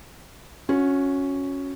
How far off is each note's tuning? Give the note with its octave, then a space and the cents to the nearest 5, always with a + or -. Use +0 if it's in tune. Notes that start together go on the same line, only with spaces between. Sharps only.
C#4 +0 F#4 -25